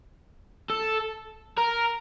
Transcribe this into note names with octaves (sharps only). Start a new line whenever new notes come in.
A4
A#4